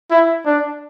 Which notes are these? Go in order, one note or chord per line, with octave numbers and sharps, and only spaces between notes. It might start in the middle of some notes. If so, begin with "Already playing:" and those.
E4
D4